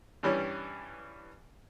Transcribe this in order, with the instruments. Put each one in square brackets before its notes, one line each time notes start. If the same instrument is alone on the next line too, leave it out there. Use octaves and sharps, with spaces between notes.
[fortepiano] G2 E3 G3 C#4